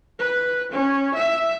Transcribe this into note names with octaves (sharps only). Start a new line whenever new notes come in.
B4
C#4
E5